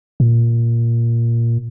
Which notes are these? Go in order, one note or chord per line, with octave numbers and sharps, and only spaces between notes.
A#2